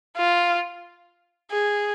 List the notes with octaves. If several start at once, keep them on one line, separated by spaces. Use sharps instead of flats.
F4
G#4